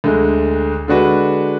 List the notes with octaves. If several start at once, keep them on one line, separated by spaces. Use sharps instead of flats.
D2 D3 G#3
D3 G#3 D4 F#4 B4